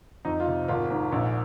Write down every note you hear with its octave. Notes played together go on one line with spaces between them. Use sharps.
F2 D#4
F4
C3
G#1 F4
G#2
A#1